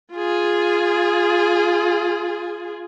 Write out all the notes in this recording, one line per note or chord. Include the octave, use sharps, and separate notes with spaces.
F4 G#4